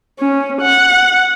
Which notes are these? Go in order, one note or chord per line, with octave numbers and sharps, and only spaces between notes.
C#4
F#5